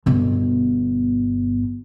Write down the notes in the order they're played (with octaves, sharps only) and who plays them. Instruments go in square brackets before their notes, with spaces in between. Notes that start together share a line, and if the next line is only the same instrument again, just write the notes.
[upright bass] G1 B2